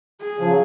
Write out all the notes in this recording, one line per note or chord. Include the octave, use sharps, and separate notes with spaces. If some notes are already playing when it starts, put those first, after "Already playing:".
G#4
C#3 F3
F#3